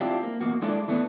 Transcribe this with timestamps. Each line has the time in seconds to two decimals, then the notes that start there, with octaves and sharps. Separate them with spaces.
0.01 C4 D4 E4 F4 G4
0.23 A#3
0.41 E2 B2 A#3 F#4
0.62 G#3 D4 E4 F4 A4 D5
0.88 E3 A3 B3 D4